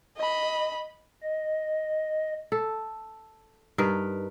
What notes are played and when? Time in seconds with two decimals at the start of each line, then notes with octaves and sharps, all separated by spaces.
0.16 D#5 B5
1.23 D#5
2.52 A4
3.78 G2 D#4 A#4 B4